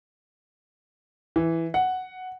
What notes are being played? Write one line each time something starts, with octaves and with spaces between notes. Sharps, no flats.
E3
F#5